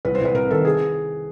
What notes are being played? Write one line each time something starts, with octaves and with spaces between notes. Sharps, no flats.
C2 B4
C5
C2 B4
C3 A#4
D#3 A4
G#4